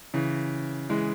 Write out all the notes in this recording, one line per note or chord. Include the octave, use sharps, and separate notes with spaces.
C#3 E3
E3 G#3